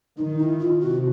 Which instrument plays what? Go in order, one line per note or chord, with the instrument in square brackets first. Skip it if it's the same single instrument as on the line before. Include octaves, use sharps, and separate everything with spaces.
[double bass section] D#3 [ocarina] D#4
[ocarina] E4
F4
[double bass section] C3 [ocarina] F#4